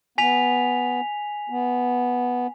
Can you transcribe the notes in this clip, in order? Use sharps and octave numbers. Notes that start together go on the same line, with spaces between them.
B3 G#5 B6 F7
B3